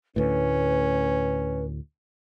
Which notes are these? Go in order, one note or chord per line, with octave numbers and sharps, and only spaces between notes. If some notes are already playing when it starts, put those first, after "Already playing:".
D2 A2 C#4 B4